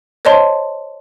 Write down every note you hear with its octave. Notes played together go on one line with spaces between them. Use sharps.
C5 C#5 D#5 A5 C6